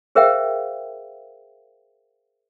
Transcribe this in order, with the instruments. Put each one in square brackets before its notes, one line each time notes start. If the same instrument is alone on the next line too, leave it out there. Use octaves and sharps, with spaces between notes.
[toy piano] G#4 A#4 C5 E5 F5 G5